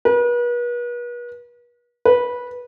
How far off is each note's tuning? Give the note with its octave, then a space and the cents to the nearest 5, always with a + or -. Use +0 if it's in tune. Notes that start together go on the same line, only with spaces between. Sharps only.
B4 -40
B4 -15